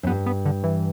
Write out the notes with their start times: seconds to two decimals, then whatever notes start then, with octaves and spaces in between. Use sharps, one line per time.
0.03 F#2
0.07 G2 B3
0.26 B3
0.45 D3
0.63 E3